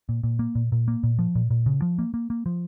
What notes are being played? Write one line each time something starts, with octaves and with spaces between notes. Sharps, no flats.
A#2
A#2
A#3
A#2
A#2
A#3
A#2
F3
A#2
A#2
C#3
F3
A#3
A#3
A#3
F3